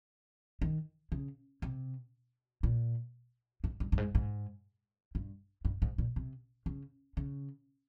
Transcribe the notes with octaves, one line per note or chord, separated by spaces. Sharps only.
D#3
C#3
C3
A#2
G#2
G2
G2
G#2
G#2
G2
G2
G#2
A#2
C3
C#3
C#3